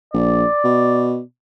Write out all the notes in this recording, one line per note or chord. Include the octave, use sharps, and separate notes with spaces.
A#1 D5
B2